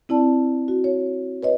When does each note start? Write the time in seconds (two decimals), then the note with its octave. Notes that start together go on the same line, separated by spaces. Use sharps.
0.09 C4 E4 D5 A5
0.68 F#4
0.84 C#5
1.43 B4 C#5 D#5